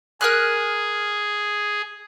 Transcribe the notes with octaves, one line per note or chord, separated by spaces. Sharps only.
G#4 A#4 F6 F#6